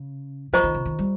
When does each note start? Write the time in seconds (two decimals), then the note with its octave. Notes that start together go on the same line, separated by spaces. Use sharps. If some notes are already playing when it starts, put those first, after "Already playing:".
Already playing: C#3
0.53 F3 F4 C5 D#5 A#5 C#6
0.64 D#3
0.75 C#3
0.86 D#3
0.99 G3